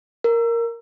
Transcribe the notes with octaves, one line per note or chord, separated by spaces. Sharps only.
A#4